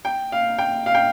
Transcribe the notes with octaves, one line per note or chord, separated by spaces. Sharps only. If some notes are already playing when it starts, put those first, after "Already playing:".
G5
F5
G5
F5
G5